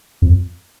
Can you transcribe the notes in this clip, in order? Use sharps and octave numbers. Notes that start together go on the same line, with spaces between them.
F2